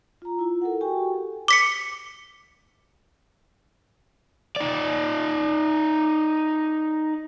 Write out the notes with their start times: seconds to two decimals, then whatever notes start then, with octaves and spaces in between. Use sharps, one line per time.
0.22 F4 A#5
0.39 E4 F4
0.61 A4 A#4 F#5
0.81 F#4 G4 G5 G#5 C#6
1.12 A4
1.48 D6 B6 C#7
4.56 D#4 D5